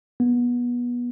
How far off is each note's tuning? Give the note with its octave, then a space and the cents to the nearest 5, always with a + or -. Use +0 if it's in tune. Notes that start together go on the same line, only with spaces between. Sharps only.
B3 -25